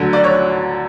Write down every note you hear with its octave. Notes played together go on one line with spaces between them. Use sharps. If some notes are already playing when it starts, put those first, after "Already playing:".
Already playing: D2 D3 F#3
D5
C#5